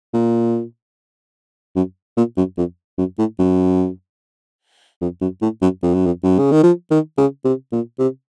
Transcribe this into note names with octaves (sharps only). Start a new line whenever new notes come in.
A#2
F#2
A#2
F#2
F2
F#2
A2
F#2
F2
F#2
A2
F#2
F2
F#2
F2
F#2
C#3
D#3
F3
D#3
C#3
C3
A#2
C3